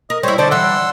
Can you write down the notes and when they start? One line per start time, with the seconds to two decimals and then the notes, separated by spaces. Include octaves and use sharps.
0.10 A#4 D#5
0.23 G3 E4 C5 C#5
0.38 D3 C5 D5 A5
0.51 E3 G3 F#5 C6 E6